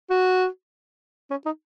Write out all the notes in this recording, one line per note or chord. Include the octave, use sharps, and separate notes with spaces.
F#4
C#4
D#4